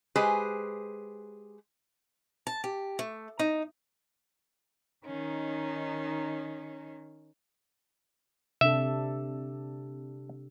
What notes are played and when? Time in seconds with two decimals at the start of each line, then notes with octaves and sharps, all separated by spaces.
0.16 G#3 G4 G#4 B4 C5
2.47 A5
2.64 G4
2.99 A3
3.39 D#4
5.05 D#3 C#4 D#4
8.61 C3 D4 A4 E5